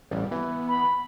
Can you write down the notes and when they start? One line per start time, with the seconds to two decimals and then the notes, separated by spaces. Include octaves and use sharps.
0.11 A1 G3
0.31 E3 B3
0.68 B5